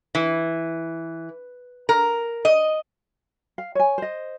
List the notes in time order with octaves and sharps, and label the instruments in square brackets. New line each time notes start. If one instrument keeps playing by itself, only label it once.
[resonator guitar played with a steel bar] E3
A#4
D#5
[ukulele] F5
C#5 G#5
C5 D#5